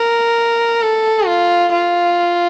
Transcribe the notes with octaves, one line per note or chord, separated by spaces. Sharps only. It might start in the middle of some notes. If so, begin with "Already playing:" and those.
Already playing: A#4
A4
F4
F4